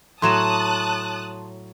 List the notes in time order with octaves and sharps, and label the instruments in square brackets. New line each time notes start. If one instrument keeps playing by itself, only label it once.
[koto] A2 F#3 F#4 [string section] A5 D#6 F#6 [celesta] C6 E7